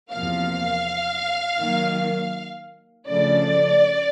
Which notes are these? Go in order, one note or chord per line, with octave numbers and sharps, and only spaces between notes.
E2 C3 F3 A#3 F5
D#3 F#3 A#3
C#3 F3 A3 D4 D5